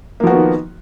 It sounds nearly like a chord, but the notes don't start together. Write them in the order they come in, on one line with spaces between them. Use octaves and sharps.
A#3 F3 F#4 B3 D#3